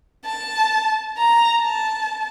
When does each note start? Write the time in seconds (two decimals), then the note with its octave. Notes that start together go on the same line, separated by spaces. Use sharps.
0.25 A5
1.17 A#5
1.62 A5